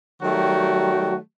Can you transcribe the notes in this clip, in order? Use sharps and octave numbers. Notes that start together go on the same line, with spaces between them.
D#3 F#3 G3 A3 F#4 G5